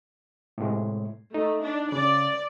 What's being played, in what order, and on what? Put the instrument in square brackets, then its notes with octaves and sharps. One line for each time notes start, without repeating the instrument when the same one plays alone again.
[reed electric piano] A2 C3 G#3
[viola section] A3 [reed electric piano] D#4
[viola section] D4
[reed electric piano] C#3 [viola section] D5